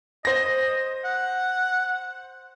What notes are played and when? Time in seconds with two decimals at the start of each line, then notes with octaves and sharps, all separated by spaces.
0.25 C5 D#5 A#6
1.05 F#5